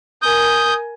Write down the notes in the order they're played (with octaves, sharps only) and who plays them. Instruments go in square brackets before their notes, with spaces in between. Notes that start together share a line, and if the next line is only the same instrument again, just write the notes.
[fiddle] A#4 G#5 [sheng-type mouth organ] D#6 G6